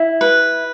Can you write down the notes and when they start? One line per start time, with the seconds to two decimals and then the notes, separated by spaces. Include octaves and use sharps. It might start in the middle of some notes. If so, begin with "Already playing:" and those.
Already playing: E4
0.21 B4